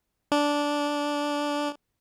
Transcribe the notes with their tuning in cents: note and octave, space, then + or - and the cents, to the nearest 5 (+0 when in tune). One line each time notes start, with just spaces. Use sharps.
D4 -10